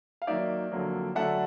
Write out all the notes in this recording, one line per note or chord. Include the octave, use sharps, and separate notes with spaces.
F5
D#3 F#3 A#3 D#4 D5 E5
F2 D3 F#3 A#3
D3 F#3 A3 D4 E5 F#5